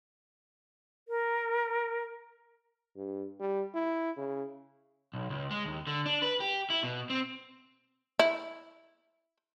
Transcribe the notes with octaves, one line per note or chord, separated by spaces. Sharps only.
A#4
G2
G3
E4
C#3
B1
C#2
G#3
D#2
D3
D4
B4
G4
E4
B2
C4
E4